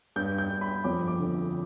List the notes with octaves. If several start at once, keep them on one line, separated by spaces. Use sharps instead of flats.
G2 G6
G6
G2
B5
F2 D6
D6
D3